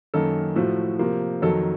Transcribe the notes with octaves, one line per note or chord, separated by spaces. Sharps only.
F#2 D#3 A#3 A4
A2 F3 A3 F#4
C3 F3 A#3
F2 D#3 F#3 A4